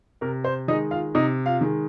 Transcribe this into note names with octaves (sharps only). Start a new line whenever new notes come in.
C3 A#4
C5
D#3 G#3 D#4 D#5
F4 F5
C3 D#4 D#5
F4 F5
D#3 G#3